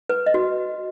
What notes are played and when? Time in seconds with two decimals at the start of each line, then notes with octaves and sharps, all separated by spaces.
0.09 B4
0.26 D#5
0.34 F#4